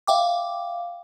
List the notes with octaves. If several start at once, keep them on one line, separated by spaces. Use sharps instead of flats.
E5 F5 G5 D6